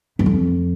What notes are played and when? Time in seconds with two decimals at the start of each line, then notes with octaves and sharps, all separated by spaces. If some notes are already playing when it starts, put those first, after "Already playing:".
0.19 E2
0.26 F2